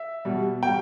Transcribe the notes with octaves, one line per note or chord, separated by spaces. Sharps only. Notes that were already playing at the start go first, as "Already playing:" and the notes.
Already playing: E5
B2 G3
B2 G3 G5